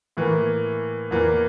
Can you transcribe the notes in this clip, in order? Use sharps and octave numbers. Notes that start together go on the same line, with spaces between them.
A2 E3 A#3
E2 E3 A#3